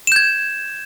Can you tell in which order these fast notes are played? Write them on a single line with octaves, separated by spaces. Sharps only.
E7 G6 G#6